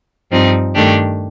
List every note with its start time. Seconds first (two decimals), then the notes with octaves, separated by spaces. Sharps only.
0.32 G2 F3 C4 D#4
0.75 G2 D#3 A3 D4 G4